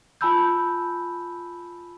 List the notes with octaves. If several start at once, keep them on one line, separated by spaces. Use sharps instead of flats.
F4 G#5 A5 B5 E6 G6